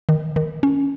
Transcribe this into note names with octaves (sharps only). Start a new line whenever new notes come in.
D#3
D#3
C#4